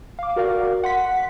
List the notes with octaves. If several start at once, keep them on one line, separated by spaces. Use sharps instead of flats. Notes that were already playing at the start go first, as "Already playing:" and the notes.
F5 D6
F#4 A#4 D5 F5
F#5 C6 B6